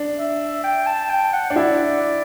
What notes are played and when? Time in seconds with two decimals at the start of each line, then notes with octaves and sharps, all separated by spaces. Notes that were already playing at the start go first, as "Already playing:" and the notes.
Already playing: D4
0.18 E5
0.64 G5
0.87 A5
1.10 G5
1.33 F#5
1.50 D4
1.56 E4 D5